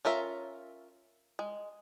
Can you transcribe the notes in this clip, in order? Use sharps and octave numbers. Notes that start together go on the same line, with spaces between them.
C#4 F4 A#4 E5
G#3